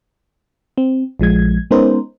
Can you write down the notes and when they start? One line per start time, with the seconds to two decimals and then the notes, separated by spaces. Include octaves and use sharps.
0.78 C4
1.20 A#1 F3 G#3 G#6
1.71 G#3 B3 C#4 D#4 A#4 C5